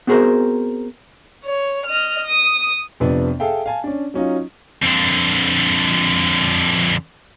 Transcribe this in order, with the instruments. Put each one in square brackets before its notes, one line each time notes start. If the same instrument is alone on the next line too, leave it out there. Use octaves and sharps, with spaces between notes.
[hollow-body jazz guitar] B3 C4 F#4 G#4 A#4 C5
[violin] C#5
D#5 F6
D#6
[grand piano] F2 C3 B3 D4
G#4 A4 E5 F5 G5
F5 G#5 A5
C#4 D4
F#3 C#4 D#4 F4
[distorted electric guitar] F2 D3